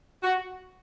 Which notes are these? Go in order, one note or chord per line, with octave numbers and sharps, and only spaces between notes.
F#4